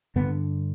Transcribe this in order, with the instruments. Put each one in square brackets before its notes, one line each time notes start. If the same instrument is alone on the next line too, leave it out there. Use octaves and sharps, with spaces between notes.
[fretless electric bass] G2 D3 B3